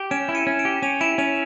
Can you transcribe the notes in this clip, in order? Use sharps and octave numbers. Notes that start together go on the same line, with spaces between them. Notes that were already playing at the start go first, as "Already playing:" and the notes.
Already playing: G4
C#4 D7 E7
E4
C#7 D#7
C#4
D7 E7
G4
C#4 D#7 F7
E4 D7 E7
C#4 D#7 F7